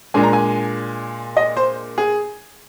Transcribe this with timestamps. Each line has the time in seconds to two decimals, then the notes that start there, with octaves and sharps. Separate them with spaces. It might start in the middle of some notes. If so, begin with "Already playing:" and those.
0.14 A#2 G#3 D4 G#5
0.23 A#5
0.33 G#5
1.37 D#5
1.57 C5
1.98 G#4